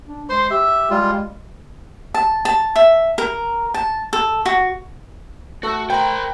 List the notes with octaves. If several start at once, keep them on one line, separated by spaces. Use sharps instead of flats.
D4
G#3 C5 C6
G4 E5
G3 G#3 F4
A5
A5
E5
A#4
A5
A4
F#4
A3 F#4 A4
A#4 C5 G5 A#5 B5